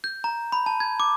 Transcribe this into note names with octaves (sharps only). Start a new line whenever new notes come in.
G6
A#5
B5
A5
G#6
D6